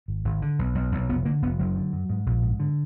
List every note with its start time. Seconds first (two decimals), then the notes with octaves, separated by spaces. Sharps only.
0.08 G#1
0.25 G#1
0.42 D3
0.59 B1
0.75 B1
0.92 B1
1.09 F1 B3
1.25 D3 A#3
1.42 F1 B3
1.59 F#1 F#3
1.76 D3
1.93 F#2
2.09 G#2
2.26 A#1
2.43 G#2
2.60 D3